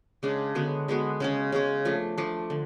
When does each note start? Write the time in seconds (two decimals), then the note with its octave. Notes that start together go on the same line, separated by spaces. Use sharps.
0.23 C#3 G#3 D4
0.55 D3 G#3 B3 F#4
0.88 D3 G#3 B3 F#4
1.20 C#3 G#3 C#4
1.52 C#3 G#3 C#4
1.85 F3 A3 D4
2.18 F3 A3 D4
2.50 D3